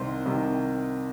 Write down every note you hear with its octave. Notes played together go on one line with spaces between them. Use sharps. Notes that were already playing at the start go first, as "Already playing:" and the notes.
Already playing: C2 C3 D#3 C5
C2 C3 D#3